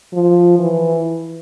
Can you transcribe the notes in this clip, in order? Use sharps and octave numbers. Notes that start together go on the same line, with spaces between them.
F3
E3